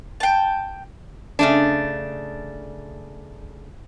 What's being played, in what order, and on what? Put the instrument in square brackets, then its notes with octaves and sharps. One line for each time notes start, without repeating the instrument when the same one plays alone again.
[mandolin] G5 A5
[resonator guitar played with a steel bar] C#3 A3 D4